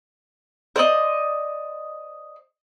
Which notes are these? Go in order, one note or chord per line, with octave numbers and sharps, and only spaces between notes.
C5 D5 D#5